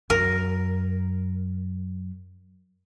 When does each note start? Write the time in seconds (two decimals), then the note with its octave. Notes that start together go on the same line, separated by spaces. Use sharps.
0.10 F#2 A#4